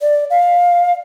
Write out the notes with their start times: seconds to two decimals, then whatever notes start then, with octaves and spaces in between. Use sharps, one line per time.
0.01 D5
0.30 F5